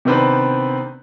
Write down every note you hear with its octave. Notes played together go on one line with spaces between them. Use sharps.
C3 D#3 B3 C4 D4 B4